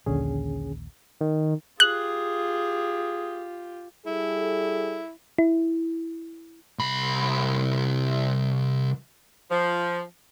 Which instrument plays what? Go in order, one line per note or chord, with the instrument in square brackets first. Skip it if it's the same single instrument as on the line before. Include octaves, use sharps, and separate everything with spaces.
[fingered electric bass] A#1 D#2 [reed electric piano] D3 C#4 G#4
[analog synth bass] D#3
[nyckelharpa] F4 G4 [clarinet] G#4 [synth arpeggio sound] F#6
[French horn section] G3 G#4 A4 [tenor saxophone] E4
[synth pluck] E4
[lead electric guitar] C2 B5
[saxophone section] F3